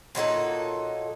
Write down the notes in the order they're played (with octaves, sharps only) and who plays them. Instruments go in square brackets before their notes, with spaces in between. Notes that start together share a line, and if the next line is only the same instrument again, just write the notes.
[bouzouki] A#2 F#3 D#4 A4